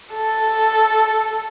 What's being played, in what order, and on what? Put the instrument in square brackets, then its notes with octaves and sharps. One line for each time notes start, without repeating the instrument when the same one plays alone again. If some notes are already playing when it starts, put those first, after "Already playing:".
[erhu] A4